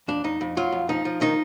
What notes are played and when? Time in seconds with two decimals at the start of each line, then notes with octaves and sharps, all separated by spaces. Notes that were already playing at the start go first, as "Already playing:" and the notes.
0.08 F2 D4
0.24 F2 D#4
0.41 F2
0.57 F#3 F4
0.72 F2
0.89 F3 D#4
1.05 F3
1.21 D#3 D#4